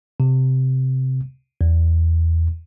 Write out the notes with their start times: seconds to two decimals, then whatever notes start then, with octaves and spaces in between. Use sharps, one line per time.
0.20 C3
1.61 E2